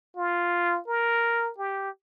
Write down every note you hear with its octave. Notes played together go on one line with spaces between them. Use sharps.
F4
A#4
G4